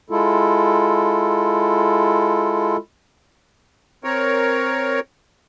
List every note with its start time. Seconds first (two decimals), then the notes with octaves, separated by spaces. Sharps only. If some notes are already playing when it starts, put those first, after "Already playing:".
0.10 G#3 E4 F4 A4
4.04 C4 A#4 C#5